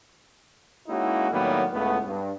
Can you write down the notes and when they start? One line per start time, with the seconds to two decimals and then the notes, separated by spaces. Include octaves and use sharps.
0.88 G#3 A#3 C#4 D#4 E4 F#4
1.31 A2 D#3 F#3 G3 A#3 B3
1.72 C#2 A2 B3
2.05 G2